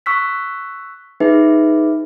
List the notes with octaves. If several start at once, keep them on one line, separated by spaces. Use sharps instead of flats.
C#6 E6 F#6 B6
D#4 G#4 B4 E5